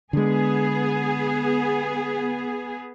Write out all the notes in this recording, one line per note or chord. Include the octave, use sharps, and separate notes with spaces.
D3 G#3 B3 G#4